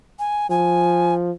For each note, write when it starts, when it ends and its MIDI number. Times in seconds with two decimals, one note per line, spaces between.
0.19 0.47 80
0.50 1.31 53
0.50 1.14 80